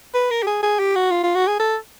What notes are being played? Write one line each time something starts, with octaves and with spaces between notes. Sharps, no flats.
B4
A#4
G4
G#4
G#4
G4
F#4
F4
F4
F#4
G#4
A4